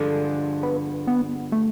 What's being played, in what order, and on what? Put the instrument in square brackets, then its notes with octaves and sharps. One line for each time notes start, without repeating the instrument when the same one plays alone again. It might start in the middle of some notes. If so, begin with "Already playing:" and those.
Already playing: [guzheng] G2 D3 F3 G#3
[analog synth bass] B3
B3
A3